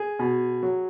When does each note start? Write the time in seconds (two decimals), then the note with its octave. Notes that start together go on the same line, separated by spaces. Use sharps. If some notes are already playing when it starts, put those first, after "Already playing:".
Already playing: G#4
0.19 B2
0.63 F#3